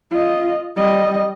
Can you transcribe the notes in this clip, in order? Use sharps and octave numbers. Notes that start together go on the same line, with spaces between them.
F4 D#5
G3 D#5